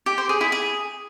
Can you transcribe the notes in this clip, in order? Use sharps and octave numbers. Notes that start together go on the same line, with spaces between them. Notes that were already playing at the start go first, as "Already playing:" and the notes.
G4
C5
G#4
E4
G#4